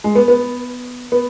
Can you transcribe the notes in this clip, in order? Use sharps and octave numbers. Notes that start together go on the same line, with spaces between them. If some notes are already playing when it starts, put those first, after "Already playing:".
G#3
B3
B3
B3